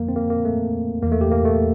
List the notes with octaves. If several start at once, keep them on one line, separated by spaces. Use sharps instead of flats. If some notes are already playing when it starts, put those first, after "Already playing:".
Already playing: F2 D3 F3 A#3
C4
A#3
A#3
A3
E2 E3 A#3
A3
G4
A#3
A3